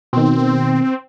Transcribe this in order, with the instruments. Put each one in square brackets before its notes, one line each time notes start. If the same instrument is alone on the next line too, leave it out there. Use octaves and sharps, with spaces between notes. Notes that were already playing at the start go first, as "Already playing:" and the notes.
[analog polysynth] B2 D#3 [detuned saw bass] C4